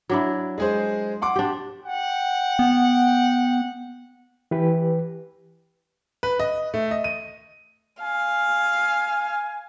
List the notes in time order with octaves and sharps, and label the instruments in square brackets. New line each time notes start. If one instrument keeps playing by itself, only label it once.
[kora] F#3 D4 E4
[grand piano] G#3 G#4 C5
F#5 C6 D6
[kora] D4 G4
[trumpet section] F#5 G5
[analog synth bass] B3
[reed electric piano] E3 G4 B4
[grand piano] B4
D#5
A3
D#5
D#7
[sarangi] F5 [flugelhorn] G#5